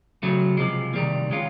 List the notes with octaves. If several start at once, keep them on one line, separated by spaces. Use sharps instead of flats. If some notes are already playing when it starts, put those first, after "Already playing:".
C#3 F#3 A3
C3 F3 G#3
C3 D#3 G3 A#3
D#3 G#3 C#4 F4